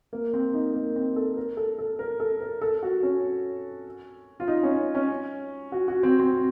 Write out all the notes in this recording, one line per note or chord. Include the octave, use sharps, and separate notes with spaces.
A#3
C4
D#4
A#3
C4
A4
A#4
A4
A4
A#4
A4
A#4
A4
F#4
C#4
F4
D#4
C#4
C#4
F#4
F#4
C4
C4